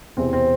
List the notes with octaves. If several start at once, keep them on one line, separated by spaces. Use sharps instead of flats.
E1 E2 C3 E3 C4
C4